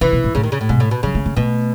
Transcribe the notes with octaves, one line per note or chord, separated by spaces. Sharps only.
C#3 E3
B2
A2
A2 C#3
D#3
C#3
A2
G#2 B2
A2
B2
C#3 F#3
A3
A3
B2 A3